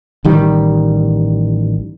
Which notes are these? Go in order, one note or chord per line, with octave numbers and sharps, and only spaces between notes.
A1 D#3 G3